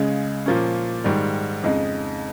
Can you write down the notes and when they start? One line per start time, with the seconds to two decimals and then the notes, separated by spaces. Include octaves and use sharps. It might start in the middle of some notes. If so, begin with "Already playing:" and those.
Already playing: C#2 C#3 G#3
0.46 A#2 F3 A#3 C#4
1.04 G#2 D#3 G3
1.63 F2 C#3 G#3 D#4